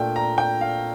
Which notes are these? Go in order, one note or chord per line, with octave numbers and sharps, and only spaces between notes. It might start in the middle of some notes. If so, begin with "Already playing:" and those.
Already playing: A#2 A3 D4 G5
A#5
G5
F5